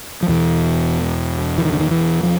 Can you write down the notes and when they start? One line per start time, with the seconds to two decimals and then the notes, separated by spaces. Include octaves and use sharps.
0.23 F3
0.28 E2 B2 E3
1.58 E3
1.65 D#3
1.73 D3
1.80 D#3
1.91 E3
2.23 F3